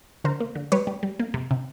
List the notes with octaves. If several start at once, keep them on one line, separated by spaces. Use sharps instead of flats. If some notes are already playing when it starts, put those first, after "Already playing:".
D3 A#4 C5
A#3
D3
G3 B4 C#5
G3
G3
A#3
C3
C3